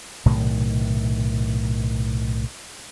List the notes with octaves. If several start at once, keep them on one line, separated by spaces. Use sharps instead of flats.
B1 A2 C3 D#3